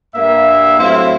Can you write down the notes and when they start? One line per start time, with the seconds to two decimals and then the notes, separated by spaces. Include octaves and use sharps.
0.15 G2 A#3 E5
0.80 A2 F#3 C4 E4 F5 C6